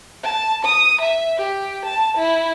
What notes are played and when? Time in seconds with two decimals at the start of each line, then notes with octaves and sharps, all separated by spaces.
0.23 A5
0.65 D#6
1.01 E5
1.37 G4
1.85 A5
2.17 E4